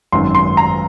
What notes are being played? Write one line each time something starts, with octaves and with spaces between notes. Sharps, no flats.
G#1 F#2 D#3 F#3 C6
C6
A#5